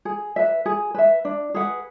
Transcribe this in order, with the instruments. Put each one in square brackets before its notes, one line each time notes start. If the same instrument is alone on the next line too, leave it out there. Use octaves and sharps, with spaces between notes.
[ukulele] G#4
B4 E5
G#4
B4 E5
D4
G#4 B4 F#5